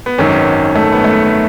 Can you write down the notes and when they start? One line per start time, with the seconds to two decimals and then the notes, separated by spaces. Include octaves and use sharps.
0.06 B3
0.18 G#1 F#2 D#3 C#4
0.76 A3
0.93 B3
1.04 A3